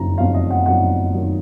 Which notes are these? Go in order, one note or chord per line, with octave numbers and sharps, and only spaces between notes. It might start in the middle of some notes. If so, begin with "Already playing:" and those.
Already playing: F#1 F2 D#3 F#3 A#5
F#1 F2 D#3 F#3 F5
D#5
F#5
F#1 F2 D#3 F#3 F#5
D#3 F#3